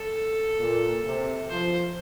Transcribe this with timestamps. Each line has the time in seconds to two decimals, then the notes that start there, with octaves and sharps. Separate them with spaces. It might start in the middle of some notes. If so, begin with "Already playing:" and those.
Already playing: A4
0.59 A#2
1.04 C3
1.49 F3 C5